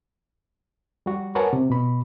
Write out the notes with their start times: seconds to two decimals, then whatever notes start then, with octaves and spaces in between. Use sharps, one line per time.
1.06 G3 F#4
1.35 A#4 B4 C#5 F#5 G#5 A5
1.53 C3
1.70 B2 B5